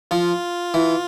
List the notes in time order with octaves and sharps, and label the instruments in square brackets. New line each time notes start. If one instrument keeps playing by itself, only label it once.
[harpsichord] F3 [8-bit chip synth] F4
[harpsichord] E3